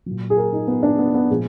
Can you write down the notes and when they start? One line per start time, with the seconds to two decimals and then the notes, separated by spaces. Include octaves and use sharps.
0.06 A#2 F#3
0.30 G#4
0.37 A#4
0.53 D#4
0.67 B3
0.83 D4
0.99 B3
1.14 B3
1.30 A#2 F3 G#3 G#4